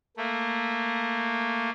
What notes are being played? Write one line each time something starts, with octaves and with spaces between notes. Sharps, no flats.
A3 A#3